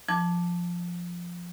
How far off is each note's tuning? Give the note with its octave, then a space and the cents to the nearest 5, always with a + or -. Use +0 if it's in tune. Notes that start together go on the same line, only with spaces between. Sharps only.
F3 +0 A5 +0 D6 +0